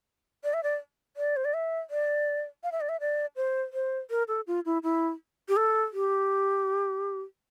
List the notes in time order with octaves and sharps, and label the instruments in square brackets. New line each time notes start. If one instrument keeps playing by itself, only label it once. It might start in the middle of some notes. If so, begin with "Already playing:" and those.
[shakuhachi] D5
E5
D5
D5
C5
D5
E5
D5
F5
E5
D5
E5
D5
C5
C5
A#4
A4
F4
E4
E4
G4
A4
G4